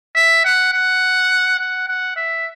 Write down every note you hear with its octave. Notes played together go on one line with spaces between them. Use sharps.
E5
F#5
F#5
F#5
F#5
E5